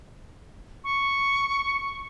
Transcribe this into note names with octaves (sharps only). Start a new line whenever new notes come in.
C#6